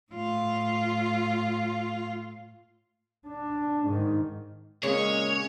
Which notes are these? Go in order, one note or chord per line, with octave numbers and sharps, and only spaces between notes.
A2 F4
D4
G#2 D#3
A#2 C#3 G#3 C#4 C#5